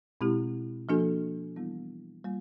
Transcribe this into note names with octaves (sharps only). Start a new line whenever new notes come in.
B2 G#3 C4 E4 G4
F3 A#3 D4 F#4 A4
E3 G3 B3 E4
G3 A#3 F4